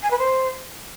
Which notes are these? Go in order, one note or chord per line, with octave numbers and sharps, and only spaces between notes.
G#5
B4
C5